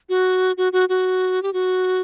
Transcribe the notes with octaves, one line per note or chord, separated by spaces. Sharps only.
F#4
F#4
F#4
F#4
G4
F#4